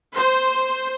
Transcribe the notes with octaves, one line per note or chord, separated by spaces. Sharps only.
C5